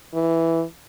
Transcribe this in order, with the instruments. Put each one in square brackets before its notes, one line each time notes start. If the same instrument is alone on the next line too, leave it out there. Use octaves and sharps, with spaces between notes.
[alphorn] E3